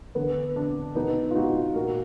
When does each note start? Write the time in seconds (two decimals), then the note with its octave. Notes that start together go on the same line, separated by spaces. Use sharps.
0.15 D3 B3
0.56 D3 D4
0.95 B2 B3 D#4
1.31 F4
1.35 G#3 D#4 F#4
1.74 A#2 F#4 A#4